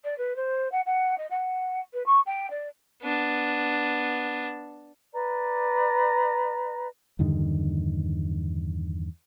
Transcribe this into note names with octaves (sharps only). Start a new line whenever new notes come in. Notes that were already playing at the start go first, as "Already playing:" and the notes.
D5
B4
C5
F#5
F#5
D#5
F#5
B4
C#6
G5
D5
B3 D4
B4 D5 A#5
E2 G2 D3 D#3